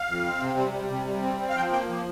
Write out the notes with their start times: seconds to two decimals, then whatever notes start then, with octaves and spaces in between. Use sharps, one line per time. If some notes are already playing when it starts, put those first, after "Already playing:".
Already playing: F5
0.09 F2
0.25 C4
0.41 C3
0.58 G3
0.73 G3
0.90 C3
1.07 G3
1.22 C4
1.39 C4
1.49 F5
1.56 F3 G5
1.72 A#3 G5
1.89 F3